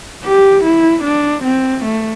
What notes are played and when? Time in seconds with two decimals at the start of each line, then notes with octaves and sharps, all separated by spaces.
0.24 G4
0.64 E4
1.04 D4
1.44 C4
1.84 A3